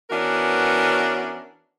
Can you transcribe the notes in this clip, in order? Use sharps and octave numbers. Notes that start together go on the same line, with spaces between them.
E3 B3 C#4 D4 F#4 A#4